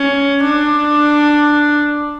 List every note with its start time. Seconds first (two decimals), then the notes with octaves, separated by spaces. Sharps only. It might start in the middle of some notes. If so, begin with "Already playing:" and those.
Already playing: C#4
0.43 D4